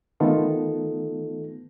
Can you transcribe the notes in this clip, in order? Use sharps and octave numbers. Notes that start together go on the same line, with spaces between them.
D#3 A3 B3 D#4 F4 A4